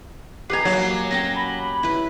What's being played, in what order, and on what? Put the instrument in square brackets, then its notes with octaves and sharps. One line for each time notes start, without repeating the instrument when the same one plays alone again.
[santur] G4 G#5 [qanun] B4 D#5 A#5 [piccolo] C7
[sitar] F#3 [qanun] A#3
[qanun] C#4 F#5 G5 [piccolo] A#6
[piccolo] B5
[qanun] E4 B4